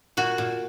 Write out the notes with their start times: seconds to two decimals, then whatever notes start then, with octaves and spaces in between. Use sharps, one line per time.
0.17 A#2 F#4
0.38 A#2